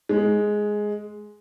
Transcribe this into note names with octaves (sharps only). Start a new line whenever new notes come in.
G#3